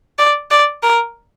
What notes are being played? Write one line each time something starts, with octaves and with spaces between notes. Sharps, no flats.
D5
D5
A#4